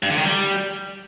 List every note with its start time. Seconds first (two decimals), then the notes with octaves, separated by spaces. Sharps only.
0.03 G2
0.10 D3
0.18 D#3
0.25 G3